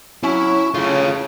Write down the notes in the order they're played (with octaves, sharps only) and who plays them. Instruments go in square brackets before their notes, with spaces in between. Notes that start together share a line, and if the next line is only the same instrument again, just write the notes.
[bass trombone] F#3 [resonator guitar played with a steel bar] C#4 [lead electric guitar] E4
[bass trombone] C#3 [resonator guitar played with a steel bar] A3 [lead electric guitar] F4 C#5